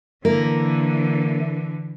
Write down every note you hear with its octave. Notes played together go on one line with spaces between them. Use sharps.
D3 E3 A#3 E4 A#4